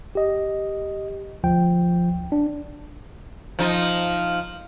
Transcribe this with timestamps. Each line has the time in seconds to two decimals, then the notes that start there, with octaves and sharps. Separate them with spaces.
0.15 G4 D#5
1.43 D2 F3 G5
2.32 D4
3.59 F3 D#4